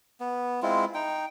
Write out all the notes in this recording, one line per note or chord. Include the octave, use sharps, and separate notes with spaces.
B3
G#3 C4 E4 F4
D#4 G5